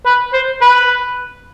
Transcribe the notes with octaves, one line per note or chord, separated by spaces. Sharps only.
B4
C5
B4